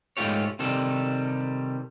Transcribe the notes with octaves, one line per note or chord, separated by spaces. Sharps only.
G#2 A3 F4 G4 C#5
C3 D#3 G3 A4